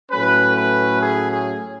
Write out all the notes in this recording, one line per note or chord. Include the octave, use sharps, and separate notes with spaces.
A2 F#3 A3 C#4 B4
B4
G#4
G#4